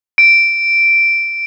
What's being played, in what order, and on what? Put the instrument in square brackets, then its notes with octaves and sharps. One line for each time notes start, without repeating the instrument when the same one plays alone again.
[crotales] D7